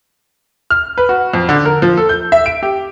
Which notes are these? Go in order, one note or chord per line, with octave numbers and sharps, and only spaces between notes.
F6
B4
F#4
F2
D3
A#4
F3
A4
G6
E5
D7
G4